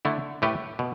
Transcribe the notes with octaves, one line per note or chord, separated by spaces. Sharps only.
D3 A3 E4
A2 A3 G4 B4
B2